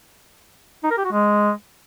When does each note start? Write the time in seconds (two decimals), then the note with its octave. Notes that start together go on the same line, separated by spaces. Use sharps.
0.84 D#4
0.91 A#4
0.98 G4
1.05 F#4
1.12 G#3